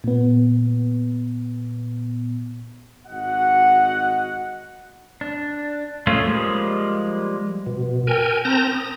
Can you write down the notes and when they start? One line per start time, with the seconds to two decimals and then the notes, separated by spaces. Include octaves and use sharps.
0.04 A#2 B3
3.07 G#1 F#4 D#5 F#5
5.21 D4
6.07 G#3 A3 C#4 F4 G#4
6.25 F3 G3 G#3 A#3
7.67 B2
8.07 A#4 G5 G#5
8.45 C4 A5 A#5 G6 A#6
8.72 D#6